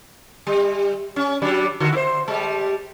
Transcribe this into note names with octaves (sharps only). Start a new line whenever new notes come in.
G3
C#4
F#3 G3 D4
D3 F#4
E4 C5
G3 G#3